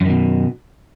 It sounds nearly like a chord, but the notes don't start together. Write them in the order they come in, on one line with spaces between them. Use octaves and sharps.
F#2 D#3 B2